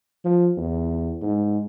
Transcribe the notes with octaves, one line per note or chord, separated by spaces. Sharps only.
F3
E2
G#2